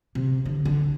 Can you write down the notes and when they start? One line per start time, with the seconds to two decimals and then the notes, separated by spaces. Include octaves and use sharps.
0.15 C3
0.45 D3
0.65 D3